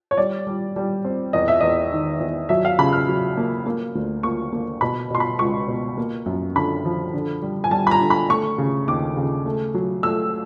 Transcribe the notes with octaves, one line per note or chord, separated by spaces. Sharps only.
C#5
G3 D5
G3
G3
C4
E2 D#5
E5
E2 D#5
D#3
E2
F#3 E5
F5
C#3 B5
F6
F#3
A#3
A#3
D2
A#3 C#6
A#3
B2 B5
B2 C6
B5
C#2 C#6
B2
A#3
F#2
D3 B5
F3
D3
G3
G#5
G3 A5
B5
A#5
D3
B5
A3 C#6
C#3
D#2 D6
C#3
A3
F#3
A3 E6